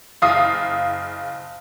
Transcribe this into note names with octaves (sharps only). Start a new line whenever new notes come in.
F#1 F5 D#6